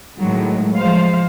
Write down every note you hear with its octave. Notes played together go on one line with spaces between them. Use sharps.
A2 D#3 F#3 G#3
F3 G#3 C5 F5